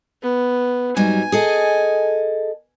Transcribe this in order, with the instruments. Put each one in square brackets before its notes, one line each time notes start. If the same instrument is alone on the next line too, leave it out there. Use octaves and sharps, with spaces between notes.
[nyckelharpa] B3
[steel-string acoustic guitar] G#2 F#3 G3 [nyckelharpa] G#5
[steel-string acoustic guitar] G#4 A4 D#5